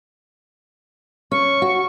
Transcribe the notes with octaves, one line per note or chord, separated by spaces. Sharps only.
C#4 C#6
F#4